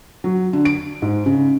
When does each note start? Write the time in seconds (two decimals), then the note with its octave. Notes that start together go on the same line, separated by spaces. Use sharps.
0.24 F#3
0.53 D3
0.65 D7
1.02 G#2
1.26 C#3